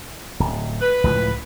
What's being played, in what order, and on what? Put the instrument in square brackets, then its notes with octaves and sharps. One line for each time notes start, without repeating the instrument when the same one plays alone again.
[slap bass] D1
[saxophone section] B4
[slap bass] C#2 A2 F3